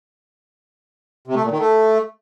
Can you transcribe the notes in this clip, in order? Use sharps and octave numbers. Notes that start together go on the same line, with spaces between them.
C3
A3
A#2
D#3
A3